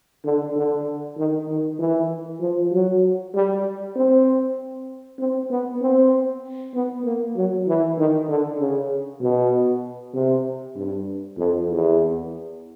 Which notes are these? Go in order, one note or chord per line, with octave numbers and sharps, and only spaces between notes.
D3
D3
D#3
D#3
E3
F3
F#3
G3
C4
C4
B3
C4
B3
A#3
F#3
E3
D#3
D3
C#3
B2
C3
G2
F2
E2